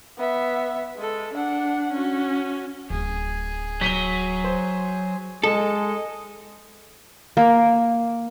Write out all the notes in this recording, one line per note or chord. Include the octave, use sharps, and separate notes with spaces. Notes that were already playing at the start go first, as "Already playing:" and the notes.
B3 E5
G#3 A4
D4 F#5
C#4 F#4
D1 G#4
F#3 B6 D#7 G7
C5
G#3 A4 D#5
A#3